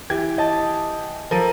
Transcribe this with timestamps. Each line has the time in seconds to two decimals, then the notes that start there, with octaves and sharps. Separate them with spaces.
0.10 E3 G4 G#6
0.38 D#5 A5
1.31 F3 A4 A#4 D#7